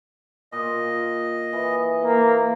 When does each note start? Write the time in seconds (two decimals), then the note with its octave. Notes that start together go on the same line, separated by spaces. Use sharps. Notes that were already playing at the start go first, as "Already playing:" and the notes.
0.52 A#2 D#5
1.53 E3
2.05 A#3